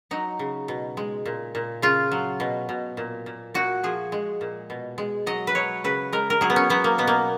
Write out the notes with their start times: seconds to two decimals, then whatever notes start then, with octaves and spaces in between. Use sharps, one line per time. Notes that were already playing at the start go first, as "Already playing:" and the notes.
0.11 F#3 D#4
0.39 C#3
0.68 B2
0.97 G#3
1.26 A#2
1.55 A#2
1.82 C#3 F4
2.12 F#3
2.40 B2
2.69 B2
2.97 A#2
3.26 A#2
3.54 A#2 F#4
3.83 F3 G#4
4.12 G#3
4.41 A#2
4.70 B2
4.98 G#3
5.26 F#3 D#5
5.47 B4
5.55 F#3 C#5
5.84 C#3 B4
6.13 G#3 A#4
6.30 A#4
6.41 F#3 G#4
6.50 B3
6.56 C#4
6.70 F#3 B3
6.84 A#3
6.98 B2 B3
7.07 A#3